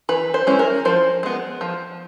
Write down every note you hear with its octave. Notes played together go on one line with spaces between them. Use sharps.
E3 B4
C5
G#3 C#4 E4
A#4
F3 C5
G#3 B3
F3